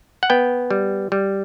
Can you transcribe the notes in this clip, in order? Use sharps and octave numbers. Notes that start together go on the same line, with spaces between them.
F#5
B3 G5
G3
G3